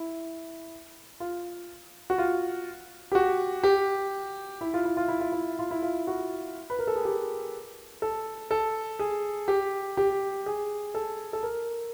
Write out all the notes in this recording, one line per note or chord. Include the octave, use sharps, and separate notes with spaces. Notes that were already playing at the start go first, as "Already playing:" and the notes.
Already playing: E4
F4
F#4
F4
G4
F#4
G4
E4
F4
E4
F4
E4
F4
E4
F4
E4
F4
F#4
B4
A#4
A4
G#4
G4
A4
A4
G#4
G4
G4
G#4
A4
A4
A#4